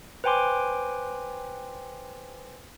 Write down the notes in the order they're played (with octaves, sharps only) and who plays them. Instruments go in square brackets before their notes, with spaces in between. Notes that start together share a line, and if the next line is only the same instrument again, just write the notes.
[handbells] B4 C5 G5 G#5 C6 D6